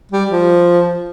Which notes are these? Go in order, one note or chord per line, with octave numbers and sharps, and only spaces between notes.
G3
F3